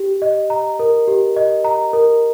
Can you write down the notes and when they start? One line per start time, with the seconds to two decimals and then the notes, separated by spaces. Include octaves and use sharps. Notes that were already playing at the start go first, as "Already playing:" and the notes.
Already playing: G4
0.22 D#5
0.50 A#5
0.79 A#4
1.08 G4
1.36 D#5
1.64 A#5
1.93 A#4